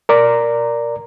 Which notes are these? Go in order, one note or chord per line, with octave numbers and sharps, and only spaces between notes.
A#4 D5 A#5